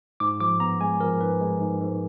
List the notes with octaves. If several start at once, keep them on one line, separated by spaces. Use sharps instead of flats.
G#2 D6
F3 D6
B3 A#5
G#3 G#5
F3 A#4
G#2 B4
G#3
G#2
G#2